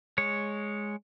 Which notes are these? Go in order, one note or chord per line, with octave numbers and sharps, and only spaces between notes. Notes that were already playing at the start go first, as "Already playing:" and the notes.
G#3 C#5